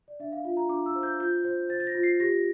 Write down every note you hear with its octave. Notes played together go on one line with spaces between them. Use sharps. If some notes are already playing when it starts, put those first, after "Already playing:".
D5
D4 E5
F5
F4
A#5
D4 D6
E6
C5
G6
F4 G6
C5
C5 A6
A6
A#6
F4
C7
G4 A#6